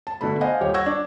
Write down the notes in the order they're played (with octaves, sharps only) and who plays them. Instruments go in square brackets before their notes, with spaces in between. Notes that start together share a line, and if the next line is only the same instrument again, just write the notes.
[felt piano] A5
B2 D3 A3 B5
C5 D#5 F5 F#5 G#5
D#1 G4 C#5
F#5 C#6 E6 G#6 A#6
D4